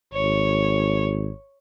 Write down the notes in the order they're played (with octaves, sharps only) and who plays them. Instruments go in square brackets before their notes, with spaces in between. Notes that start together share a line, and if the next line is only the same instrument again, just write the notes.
[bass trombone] G#1 [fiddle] C#5